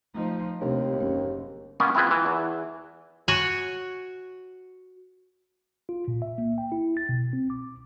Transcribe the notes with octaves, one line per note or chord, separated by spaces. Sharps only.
F3 A3 D#4
D#2 C3 A3 D4
F#1 B3 C#4 G4
A#3 B3 C#4 B4 C#5 D#5
C4 E4 F4 G#4 B4
E3
E2
F#4 C#5 F#5 G#5
F4
A#2
E5
A#3
G5
E4
A6
B2
C4
D6